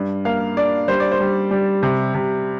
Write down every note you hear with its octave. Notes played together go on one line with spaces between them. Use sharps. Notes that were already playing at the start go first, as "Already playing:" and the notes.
Already playing: G2
A#3 F5
D4 D5
G3 C5
D5
C5
G3
G3
C3
C3